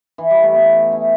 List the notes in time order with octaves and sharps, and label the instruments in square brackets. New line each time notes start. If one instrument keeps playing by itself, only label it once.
[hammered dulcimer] E3
G3
A3
B3
E4